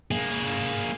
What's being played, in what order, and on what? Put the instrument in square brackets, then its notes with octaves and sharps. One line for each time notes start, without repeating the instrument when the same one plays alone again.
[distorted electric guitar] A#3 G#4